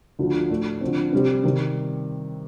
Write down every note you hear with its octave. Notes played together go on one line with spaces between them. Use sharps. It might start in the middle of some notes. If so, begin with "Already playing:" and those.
D2 D3 F3
A2 A3 D4
D3 F3 C4
C3 G3 C4
C3 D#3 G3